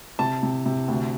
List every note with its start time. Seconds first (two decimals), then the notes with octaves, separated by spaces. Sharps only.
0.19 C3 A5
0.43 C3
0.66 C3
0.88 D2